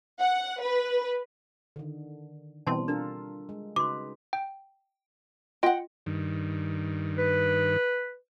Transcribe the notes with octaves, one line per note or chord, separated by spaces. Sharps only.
F#5
B4
D3 D#3
B2 E3 G3 C4 A5 C6
D4 F4 A4 A#4
G#3
C#3 D#4 F#4 B4 C6 D6
G5
F4 D#5 F#5 G5
G2 D#3
B4